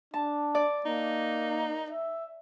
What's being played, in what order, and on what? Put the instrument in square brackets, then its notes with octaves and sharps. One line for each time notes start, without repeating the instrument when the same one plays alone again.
[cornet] D4 [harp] A5
[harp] D5
[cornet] A#3 [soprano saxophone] D#4
[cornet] E5